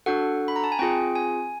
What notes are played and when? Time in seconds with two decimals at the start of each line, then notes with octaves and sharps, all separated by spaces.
0.06 D4 F#4 A4 F#5
0.48 B5
0.56 A#5
0.64 A5
0.72 G#5
0.79 C4 F4 G#4 G5
1.15 G#5